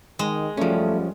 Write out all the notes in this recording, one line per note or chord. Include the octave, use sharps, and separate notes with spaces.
D#3 G#3
F#2 F3 G3 A3 C#4